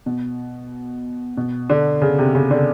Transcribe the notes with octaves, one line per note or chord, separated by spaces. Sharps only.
B2
B2
D3
C#3
C3
C#3
D3